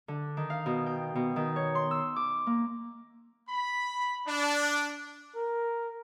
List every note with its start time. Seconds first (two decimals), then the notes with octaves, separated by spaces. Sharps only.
0.08 D3
0.37 D#3
0.50 F5
0.66 B2
0.86 G5
1.15 B2
1.36 D#3
1.56 C#5
1.75 C6
1.91 E6
2.16 D6
2.47 A#3
3.49 B5
4.27 D4
5.36 A#4